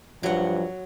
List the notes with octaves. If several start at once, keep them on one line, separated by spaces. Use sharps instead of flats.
G2 F3 F#3 F#5